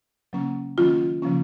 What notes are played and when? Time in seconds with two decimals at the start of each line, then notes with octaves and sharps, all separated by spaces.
0.33 C#3 F#3 A#3 C#4
0.78 D#3 F#3 A#3 C#4 F4
1.22 C#3 F3 A#3 C#4